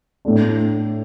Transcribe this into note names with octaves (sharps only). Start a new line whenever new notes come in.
A2 A3 D4